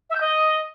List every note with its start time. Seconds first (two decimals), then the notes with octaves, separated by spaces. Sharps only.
0.10 E5
0.15 G6
0.21 D#5